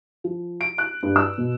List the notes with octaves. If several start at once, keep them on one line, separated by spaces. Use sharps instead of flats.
F3
D7
F#6
G2
E6
B2